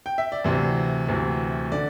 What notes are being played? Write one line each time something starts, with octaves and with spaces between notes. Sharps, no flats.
G5
E5
D5
D2 C3 E3 C5
D2 C3 E3
D3 D5